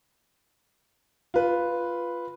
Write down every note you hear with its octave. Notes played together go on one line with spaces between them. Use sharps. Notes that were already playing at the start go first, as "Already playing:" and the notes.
F4 B4